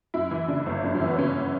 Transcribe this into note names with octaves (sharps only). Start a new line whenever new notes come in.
F#2 E4
E3
C#3 D4
G1
F#2 D4
C#4
E3
B3
C#3 C#4